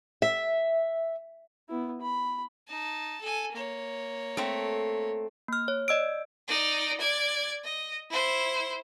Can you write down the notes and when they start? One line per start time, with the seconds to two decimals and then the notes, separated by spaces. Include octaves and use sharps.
0.22 E5
1.69 B3 E4
2.01 B5
2.68 D#4 A5
3.21 A4 G#5
3.52 A#3 C#5
4.37 A3 C4
5.48 A#3 F6
5.68 C#5
5.88 D5 D#5 E6 D7
6.48 D#4 D5
7.00 D5 G#6
7.64 D#5
8.10 E4 C5